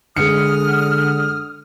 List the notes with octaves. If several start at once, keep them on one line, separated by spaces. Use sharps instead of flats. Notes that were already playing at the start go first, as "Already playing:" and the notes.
D3 G#3 F#5 D#6 F6 C#7